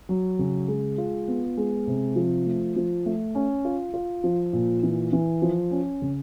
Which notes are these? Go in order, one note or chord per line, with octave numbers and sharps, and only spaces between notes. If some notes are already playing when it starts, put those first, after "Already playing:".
F#3
C#3
G#3
F4
B3
G#3
C3
F3
A3
F3
A3
C#4
F4
F4
F3
A#2
E3
E3
F3
C#4
C#3